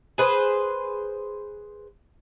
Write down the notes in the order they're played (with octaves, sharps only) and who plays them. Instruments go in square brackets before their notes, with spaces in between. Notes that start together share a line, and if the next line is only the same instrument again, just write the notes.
[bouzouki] G#4 B4 C5